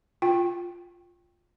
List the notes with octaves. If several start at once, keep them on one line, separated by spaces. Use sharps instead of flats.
F4 G5